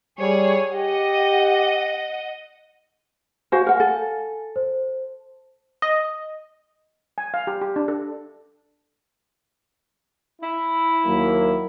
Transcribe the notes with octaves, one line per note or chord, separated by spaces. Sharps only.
G3 G#4 C#5
G4 D#5 F#5
F#4 C5 F5 G#5
A#4 F#5
A4
C5
D#5
G#5
F5
G4
G4
D4
A4
E4
D#2 F#3 A#3